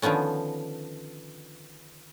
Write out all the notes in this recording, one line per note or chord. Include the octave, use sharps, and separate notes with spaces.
D3 D#3 F3 B3 C#4